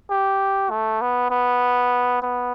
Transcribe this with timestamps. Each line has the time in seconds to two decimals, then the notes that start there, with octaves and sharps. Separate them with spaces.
0.10 G4
0.70 A3
1.01 B3
1.30 B3
2.22 B3